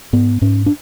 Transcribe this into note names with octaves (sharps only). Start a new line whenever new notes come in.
G#2 B3
G#2 C#4
D4